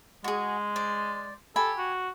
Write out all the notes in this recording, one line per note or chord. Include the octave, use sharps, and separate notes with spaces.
G#3 F#4 G#4
C5 D5
G4 A4 G#5 B5
F#4